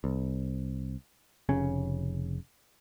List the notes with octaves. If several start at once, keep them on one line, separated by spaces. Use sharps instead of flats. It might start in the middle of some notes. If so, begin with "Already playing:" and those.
C2
F1 C#3 C#4